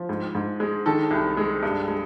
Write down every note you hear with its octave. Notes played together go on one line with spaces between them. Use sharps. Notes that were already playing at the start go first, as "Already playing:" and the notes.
Already playing: F3
G#2
G#2
G#3
D#3 A4
C2
G#3
G2
G#3